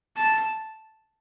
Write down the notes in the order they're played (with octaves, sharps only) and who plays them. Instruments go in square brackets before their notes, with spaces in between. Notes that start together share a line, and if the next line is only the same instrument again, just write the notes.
[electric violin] A5